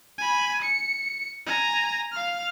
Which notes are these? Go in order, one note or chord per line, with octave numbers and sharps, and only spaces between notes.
G#5 B5
C#7
G#5 A#5
F5 F6